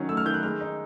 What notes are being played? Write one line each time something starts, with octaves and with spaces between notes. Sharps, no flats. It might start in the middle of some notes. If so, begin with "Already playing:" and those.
Already playing: D#3 F#3 C#4
A3 E6
F6
D#3 G6
F#6
G#3 F6
D#4